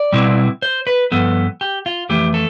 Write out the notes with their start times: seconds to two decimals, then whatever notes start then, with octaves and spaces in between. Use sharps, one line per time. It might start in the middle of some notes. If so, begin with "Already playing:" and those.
Already playing: D5
0.12 B2 G3 C4 E4
0.62 C5
0.87 B4
1.12 G2 F3 B3 A4
1.61 G4
1.86 F4
2.09 F2 E3 A3 G4
2.34 A4